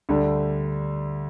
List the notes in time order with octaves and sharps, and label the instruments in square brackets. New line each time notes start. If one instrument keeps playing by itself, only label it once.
[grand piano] D2 D3 G3 D4